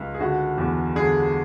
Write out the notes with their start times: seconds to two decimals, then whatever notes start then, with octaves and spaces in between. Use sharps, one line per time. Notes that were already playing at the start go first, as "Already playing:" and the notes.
Already playing: C#2
0.14 G#4
0.20 D3 F#4
0.58 E2
0.96 D3 G#4